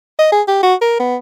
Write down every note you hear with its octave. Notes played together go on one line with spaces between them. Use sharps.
D#5
G#4
G4
F#4
A#4
B3